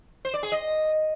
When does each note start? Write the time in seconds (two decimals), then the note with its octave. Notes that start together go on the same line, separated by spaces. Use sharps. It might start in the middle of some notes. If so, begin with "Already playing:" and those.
0.25 C5
0.34 D5
0.43 G#4
0.52 D#5